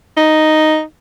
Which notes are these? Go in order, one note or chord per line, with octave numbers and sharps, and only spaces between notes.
D#4